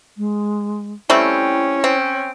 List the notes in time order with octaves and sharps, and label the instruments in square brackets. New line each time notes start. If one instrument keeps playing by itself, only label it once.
[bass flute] G#3
[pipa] G3 A3 C4 [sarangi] C#4 [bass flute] E4
[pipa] C4